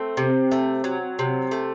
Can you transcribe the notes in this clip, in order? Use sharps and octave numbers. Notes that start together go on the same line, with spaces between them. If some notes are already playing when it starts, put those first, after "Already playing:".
Already playing: A3 C4
C3
A3
F#3
C3
A3